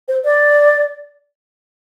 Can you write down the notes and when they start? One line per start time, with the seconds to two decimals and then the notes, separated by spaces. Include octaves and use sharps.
0.08 C5
0.25 D5